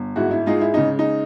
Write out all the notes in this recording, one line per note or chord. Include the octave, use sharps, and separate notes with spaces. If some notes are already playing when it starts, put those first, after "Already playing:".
Already playing: G1
G#2 E4 F#4
E4
G#3 D#4 F4
E4
C#3 D#4
D#4